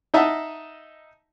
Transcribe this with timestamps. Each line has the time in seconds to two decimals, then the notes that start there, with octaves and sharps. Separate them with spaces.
0.14 D#4 D#5 E5 F#5 A5